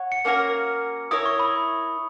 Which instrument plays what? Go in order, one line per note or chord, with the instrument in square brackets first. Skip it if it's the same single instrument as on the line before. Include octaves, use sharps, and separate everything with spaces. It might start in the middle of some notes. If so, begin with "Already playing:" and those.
Already playing: [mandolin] C#5 F#5
[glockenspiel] C#7
[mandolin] A#3 C#4 F#4 A#4
[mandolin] E4 A#4 C#5 [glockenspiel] D#6
[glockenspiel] C#6
B5